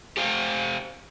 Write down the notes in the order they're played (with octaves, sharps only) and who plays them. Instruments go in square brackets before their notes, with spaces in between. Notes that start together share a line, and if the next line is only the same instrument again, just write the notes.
[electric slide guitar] G4 C5 F5